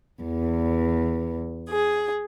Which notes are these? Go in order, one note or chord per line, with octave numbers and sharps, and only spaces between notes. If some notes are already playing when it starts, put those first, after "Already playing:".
E2
G#4